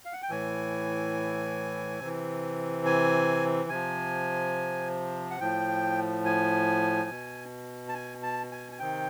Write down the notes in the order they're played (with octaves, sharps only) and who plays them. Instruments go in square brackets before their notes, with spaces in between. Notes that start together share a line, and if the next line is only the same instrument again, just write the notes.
[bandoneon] F5
F#5
G5
A2 E3 G#5
C3 E3
G#5
C3 F3 G#5
F#5
A2 F3 G5
G#5
B2
A5
G#5
A5
G#5
G#5
C3 D#3 G5